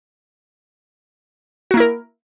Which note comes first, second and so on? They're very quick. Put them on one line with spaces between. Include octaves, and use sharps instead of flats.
F#4 A#3 E4 A#4